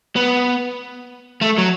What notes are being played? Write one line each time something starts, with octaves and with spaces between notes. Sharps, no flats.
B3
A3
F#3